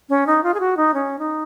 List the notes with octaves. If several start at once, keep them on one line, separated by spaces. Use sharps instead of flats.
C#4
D#4
F4
G#4
F#4
D#4
C#4
D#4